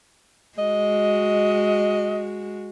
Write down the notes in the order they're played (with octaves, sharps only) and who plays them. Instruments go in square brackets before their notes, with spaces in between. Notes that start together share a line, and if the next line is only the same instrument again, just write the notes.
[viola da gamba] G#3 F#4 [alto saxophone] D#5